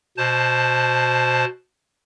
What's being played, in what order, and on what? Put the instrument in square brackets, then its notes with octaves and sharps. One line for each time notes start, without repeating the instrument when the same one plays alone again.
[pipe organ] B2 C5 A5